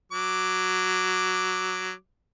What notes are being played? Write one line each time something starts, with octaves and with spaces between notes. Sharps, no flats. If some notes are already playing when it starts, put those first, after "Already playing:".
F#3 D6